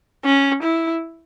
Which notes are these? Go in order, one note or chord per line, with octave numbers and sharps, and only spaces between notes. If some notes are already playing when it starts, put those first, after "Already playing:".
C#4
E4